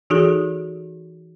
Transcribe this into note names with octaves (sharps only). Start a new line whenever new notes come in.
E3 D#4 F#4 G#4 A4